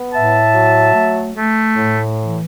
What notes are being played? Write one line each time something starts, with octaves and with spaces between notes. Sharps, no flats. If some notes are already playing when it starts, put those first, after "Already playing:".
Already playing: B3
A2 E5 A5
F#3
A3
A3
A2
E3